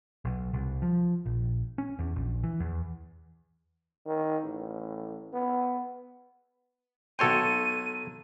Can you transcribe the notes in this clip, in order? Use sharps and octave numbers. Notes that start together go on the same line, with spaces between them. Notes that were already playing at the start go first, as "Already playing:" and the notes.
B1
C2
F3
A#1
C#4
E2
A#1
E3
E2
D#3
A1
B3
B1 F#4 A4 C#5 G5 C6 D#7